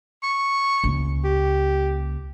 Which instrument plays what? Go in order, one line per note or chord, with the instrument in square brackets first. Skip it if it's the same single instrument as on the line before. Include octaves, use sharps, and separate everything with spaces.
[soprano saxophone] C#6
[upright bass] C#2 A#3
[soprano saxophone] G4